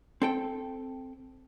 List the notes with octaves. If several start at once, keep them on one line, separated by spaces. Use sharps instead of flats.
C4 A4 G5